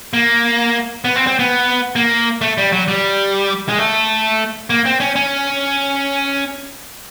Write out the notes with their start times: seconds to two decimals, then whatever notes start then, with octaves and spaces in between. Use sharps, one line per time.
0.13 A#3
1.05 B3
1.16 C4
1.27 C4
1.39 B3
1.96 A#3
2.41 A3
2.58 G3
2.72 F#3
2.88 G3
3.69 G#3
3.78 A3
4.70 A#3
4.86 C4
5.00 C#4
5.16 C#4